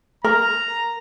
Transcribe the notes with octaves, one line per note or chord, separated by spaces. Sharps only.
A#4 A#5